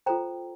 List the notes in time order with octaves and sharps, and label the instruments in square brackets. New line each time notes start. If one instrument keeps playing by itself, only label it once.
[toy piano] F4 A4 C5 G5 A#5